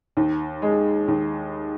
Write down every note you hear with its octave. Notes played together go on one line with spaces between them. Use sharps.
D#2
G#3
D#2